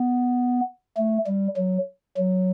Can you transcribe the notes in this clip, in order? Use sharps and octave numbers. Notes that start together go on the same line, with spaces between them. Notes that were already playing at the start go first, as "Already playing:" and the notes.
Already playing: B3
A3
G3
F#3
F#3